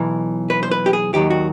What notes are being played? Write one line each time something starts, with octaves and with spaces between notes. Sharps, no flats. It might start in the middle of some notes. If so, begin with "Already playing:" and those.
Already playing: B1 E3
B4
C5
B4
G4
G#4
D#2 D#3 F#3 G4
F#4